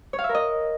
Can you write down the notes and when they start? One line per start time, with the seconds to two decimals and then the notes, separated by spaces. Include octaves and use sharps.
0.13 C#5
0.19 F5
0.24 E5
0.29 A#4
0.35 D#5